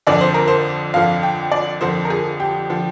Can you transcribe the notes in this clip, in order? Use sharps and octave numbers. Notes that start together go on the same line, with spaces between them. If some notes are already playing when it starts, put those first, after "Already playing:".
F2 D3 F3 D5
C5
A#4
C5
F2 D3 F3 F5
G5
D5
F2 D3 F3 C5
A#4
G#4
G4
D3 F3